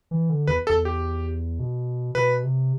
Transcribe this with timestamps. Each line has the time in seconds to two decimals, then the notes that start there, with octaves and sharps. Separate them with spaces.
0.11 E3
0.30 D3
0.47 E2 B4
0.67 A4
0.69 E2
0.85 G4
1.60 B2
2.15 B2 B4
2.44 C3